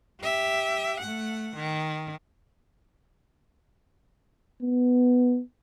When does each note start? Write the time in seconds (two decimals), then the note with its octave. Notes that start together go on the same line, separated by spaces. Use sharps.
0.21 G4 E5
1.01 A3 F#5
1.56 D#3
4.62 B3